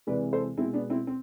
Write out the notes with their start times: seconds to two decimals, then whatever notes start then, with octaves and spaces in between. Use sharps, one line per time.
0.07 C3 E3 G#3 B4 D5
0.33 A4 C5
0.57 B2 G#3 C4 E4
0.73 B3 D4
0.90 C4 E4
1.07 C4